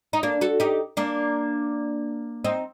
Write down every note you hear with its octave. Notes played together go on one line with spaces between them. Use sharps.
D#4
A#3 D4
F#4 A4
D#4 G4
A#3 D4
C4 D#4